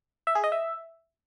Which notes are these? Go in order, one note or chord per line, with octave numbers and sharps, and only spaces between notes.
E5
G#4
D#5
E5